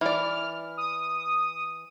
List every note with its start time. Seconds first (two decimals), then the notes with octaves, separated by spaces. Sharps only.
0.01 E3 D5 F6
0.77 D#6